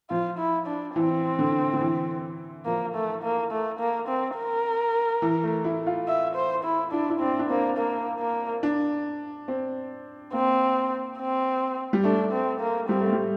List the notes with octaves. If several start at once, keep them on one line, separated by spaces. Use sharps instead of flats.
F3 F4
E4
D4
E3 C4
D3
D3
E3
F3 A#3
A3
A#3
A3
A#3
C4
A#4
E3
A3
E4
F4
E5
C5
E4
D4 E4
E4
C4 D4
D4
A#3 C4
A#3
A#3
D4
C4
A#3 C4
C4
G3
A3 D4
C4
A#3
G3 C4
A3
G3